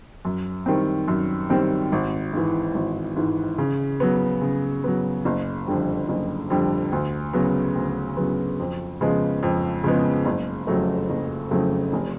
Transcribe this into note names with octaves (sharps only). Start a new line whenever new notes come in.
F#2
D#3 G3 C4
F#2
D#3 G3 C4
G#1
G#2 E3
G#1
G#2 E3
C#3
F#3 B3
C#3
F#3 B3
F#1
F2 D3 G3
F#1
F2 D3 G3
D2
C#3 F#3 B3
D2
C#3 F#3 B3
F2
C#3 F3 G#3 B3
F2
C#3 F3 G#3 B3
F#1
F2 C#3 F#3 A3
F#1
F2 C#3 F#3 A3
F1